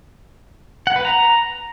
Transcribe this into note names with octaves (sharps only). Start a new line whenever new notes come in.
F#5
B4
A#5